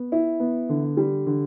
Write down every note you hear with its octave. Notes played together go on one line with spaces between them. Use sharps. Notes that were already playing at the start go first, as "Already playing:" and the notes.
Already playing: B3
E4
B3
D3
G3
D3